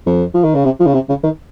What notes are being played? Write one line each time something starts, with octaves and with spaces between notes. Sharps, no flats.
F2
F3
D#3
C#3
C3
F3
C#3
C3
C#3
D#3